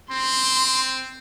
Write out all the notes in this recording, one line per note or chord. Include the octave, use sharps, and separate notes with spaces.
C4 C6